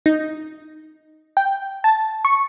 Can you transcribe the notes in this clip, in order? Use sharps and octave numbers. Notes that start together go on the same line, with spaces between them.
D#4
G5
A5
C#6